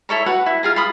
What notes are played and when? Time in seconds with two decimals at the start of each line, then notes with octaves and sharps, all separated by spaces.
0.09 E4 A4 C#5 A#5
0.26 F#4 B4 F#5
0.46 E4
0.63 F4 G#4 A#5
0.76 F4 B5 D#6